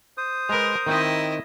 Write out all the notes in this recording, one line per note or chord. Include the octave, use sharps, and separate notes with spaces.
C5 D#6
G#3 A#4 B4
D#3 C4 D#4 E4 D#5